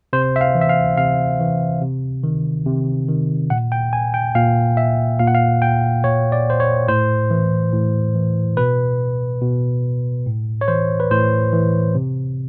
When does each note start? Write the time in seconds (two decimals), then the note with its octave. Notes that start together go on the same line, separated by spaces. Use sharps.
0.13 C3 C5
0.36 E5
0.41 F5
0.55 E3
0.61 E5
0.69 F5
0.97 C3 F5
1.40 E3
1.81 C3
2.23 D#3
2.66 C3
3.08 D#3
3.50 A#2 F#5
3.72 G5
3.93 G#5
4.14 G5
4.35 A#2 F5
4.77 E5
5.19 A#2 F5
5.27 F#5
5.35 F5
5.62 G5
6.04 A#2 C#5
6.32 D5
6.50 C5
6.60 C#5
6.88 A2 C5
7.30 E3
7.73 A2
8.15 E3
8.57 B2 B4
9.42 B2
10.26 A2
10.61 C#5
10.68 E3 C5
11.00 B4
11.11 A2 C5
11.53 E3
11.95 C3